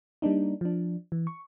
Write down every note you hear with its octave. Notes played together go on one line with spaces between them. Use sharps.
G3 A#3 D4 D#4
F3 D4
E3
C#6